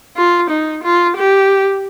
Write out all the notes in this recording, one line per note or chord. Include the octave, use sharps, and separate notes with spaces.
F4
D#4
F4
G4